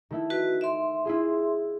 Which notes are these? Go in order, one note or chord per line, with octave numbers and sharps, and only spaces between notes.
D#3 A3 E4
F#4 B4
E5 C6 D7
E4 F4 G#4